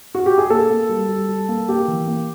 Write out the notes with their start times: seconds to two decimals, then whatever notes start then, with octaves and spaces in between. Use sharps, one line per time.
0.15 F#4
0.26 G4
0.38 G#4
0.50 A#3 A4
0.70 A#3
0.89 G3
1.09 G3
1.29 G3
1.48 A#3
1.68 A#3 G4
1.88 E3
2.07 A#3